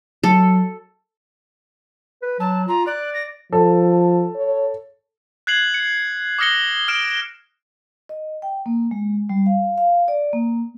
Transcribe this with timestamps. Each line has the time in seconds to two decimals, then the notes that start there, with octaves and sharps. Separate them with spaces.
0.23 F#3 A4
2.22 B4
2.40 F#3 A5
2.68 F4 A#5
2.87 D5 F#6
3.13 A#6
3.53 F3 A4
4.36 C#5
5.47 F#6 G#6 C7 F#7
5.74 C#7
6.38 D6 D#6 F6 A#6 C#7 G7
6.88 F6 D7 E7
8.09 D#5
8.42 G5
8.66 A#3
8.91 G#3
9.29 G3
9.46 F5
9.78 F5
10.08 D5
10.33 A#3